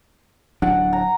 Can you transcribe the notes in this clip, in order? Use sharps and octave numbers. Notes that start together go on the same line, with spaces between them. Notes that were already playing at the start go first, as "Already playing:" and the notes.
D1 F#3 D4 F#5
A#5